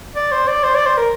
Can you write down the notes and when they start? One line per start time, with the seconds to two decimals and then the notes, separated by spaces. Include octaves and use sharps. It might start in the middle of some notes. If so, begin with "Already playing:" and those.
0.16 D5
0.32 C5
0.47 D5
0.63 C5
0.75 D5
0.86 C5
0.97 A#4